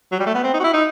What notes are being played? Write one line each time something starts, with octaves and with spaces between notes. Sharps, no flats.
F#3
G3
A3
B3
C4
D#4
F#4
E4
D#4